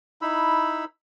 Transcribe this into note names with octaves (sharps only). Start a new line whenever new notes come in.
D#4 E4 B5 E6